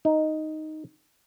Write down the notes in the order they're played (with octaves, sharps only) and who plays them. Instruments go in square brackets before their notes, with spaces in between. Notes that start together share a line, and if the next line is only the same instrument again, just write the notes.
[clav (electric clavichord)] D#4